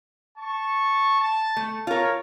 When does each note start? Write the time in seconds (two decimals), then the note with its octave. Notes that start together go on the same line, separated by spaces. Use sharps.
0.38 A5 C#6
1.21 A5
1.57 A3
1.87 F4 A#4 C#5